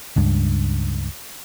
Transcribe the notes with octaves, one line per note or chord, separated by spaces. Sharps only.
C#2 G2